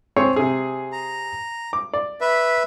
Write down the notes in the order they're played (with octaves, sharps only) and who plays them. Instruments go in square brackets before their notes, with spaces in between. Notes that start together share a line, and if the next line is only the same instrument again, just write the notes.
[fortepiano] C4 G#4 C#5
C3 G#4
[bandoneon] A#5
[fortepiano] D6
D5
[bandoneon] B4 E5